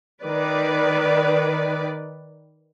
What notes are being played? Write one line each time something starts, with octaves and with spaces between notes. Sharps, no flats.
D#3 B4 D5